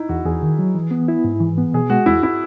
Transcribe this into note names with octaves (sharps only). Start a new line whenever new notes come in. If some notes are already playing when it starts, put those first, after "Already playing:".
Already playing: D#4 E4
E2 F#4
E2 G#4
D#3
F#3
E3
B3
E4
G#2
E3
B3
B2 G#4
G#3 F#4
E2 E4
E4